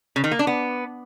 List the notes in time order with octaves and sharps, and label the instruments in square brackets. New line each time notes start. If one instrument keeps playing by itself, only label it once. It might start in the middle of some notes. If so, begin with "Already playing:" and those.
[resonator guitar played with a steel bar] C#3
D#3
A#3
D4
B3